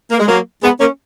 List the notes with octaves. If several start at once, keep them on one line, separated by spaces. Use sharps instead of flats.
A#3
G#3
F#3 A#3
G#3 B3
A#3 C#4